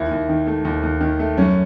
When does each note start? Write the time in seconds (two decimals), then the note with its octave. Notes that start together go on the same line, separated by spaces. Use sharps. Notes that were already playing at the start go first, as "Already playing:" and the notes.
Already playing: D#2 E4
0.11 D#2
0.29 D#3
0.47 A3
0.65 D#2
0.83 D#2
1.01 D#3
1.19 A3
1.38 F#2 C#4